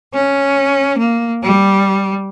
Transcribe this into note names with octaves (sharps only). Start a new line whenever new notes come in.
C#4
A#3
G3